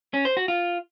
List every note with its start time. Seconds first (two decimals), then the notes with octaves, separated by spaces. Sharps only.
0.14 C#4
0.25 C5
0.37 F#4
0.48 F4